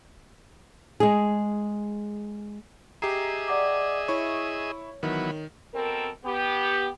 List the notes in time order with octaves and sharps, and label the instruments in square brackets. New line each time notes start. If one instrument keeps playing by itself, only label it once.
[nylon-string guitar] G#3 G#4
[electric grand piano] G4 A#5 [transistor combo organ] G#4 D#5 E5 [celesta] C7
[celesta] D5 F#5 D6
[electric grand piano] E4 C#6 [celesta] C#5
[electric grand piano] D#3 [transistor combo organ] E3 F#3 B3
[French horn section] B2 C4 A4 A#4
B3 G4